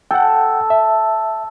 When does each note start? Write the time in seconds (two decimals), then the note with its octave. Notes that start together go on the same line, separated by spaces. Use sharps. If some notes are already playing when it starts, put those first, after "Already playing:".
0.11 A4 F#5 G5
0.70 E5